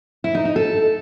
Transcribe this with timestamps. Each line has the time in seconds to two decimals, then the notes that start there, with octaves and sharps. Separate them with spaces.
0.24 E4
0.35 D#4
0.45 D#4
0.56 A4